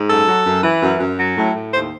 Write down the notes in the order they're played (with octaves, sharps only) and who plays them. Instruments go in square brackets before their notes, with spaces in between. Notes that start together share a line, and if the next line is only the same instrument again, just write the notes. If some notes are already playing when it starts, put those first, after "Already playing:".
Already playing: [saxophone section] G#2
F#2 A4
F#3
F#2
E3
F#2
F#2
F#3
A2
A2
D#2 C5